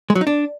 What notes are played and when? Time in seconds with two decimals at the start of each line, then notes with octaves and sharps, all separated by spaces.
0.10 G#3
0.15 F#3
0.21 D#4
0.27 D4